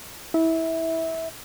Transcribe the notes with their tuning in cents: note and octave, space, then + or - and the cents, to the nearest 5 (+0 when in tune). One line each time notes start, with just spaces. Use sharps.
E4 -20